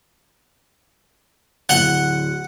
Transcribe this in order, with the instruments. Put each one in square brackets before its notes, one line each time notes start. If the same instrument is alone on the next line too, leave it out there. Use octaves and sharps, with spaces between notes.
[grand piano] D1 F#7 G7 [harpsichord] F#5